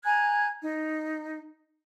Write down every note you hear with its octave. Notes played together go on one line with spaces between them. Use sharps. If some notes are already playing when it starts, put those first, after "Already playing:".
G#5 A#5 F#6 G#6
D#4